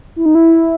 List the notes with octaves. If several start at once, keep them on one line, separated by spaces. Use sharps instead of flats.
E4
D#4
E4